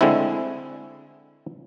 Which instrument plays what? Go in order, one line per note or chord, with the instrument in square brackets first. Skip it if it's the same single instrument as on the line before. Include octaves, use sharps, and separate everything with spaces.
[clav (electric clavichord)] D3 G#3 A3 C4 E4